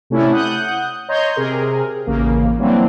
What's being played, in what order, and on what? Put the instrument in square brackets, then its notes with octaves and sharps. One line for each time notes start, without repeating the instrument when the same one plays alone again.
[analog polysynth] C3 A3 C#4 D4 E4
F#5 D#6 F#6 G6
C#5 D#5 A#5 C6 G6
C3 G#4 A#4
A1 C#3 A#3
E3 F#3 G3 A#3 C4 D4